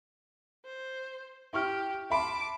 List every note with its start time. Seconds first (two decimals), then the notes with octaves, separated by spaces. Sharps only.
0.65 C5
1.53 E4 G4 C#6 F6
2.10 E5 A5 B5 C6 D6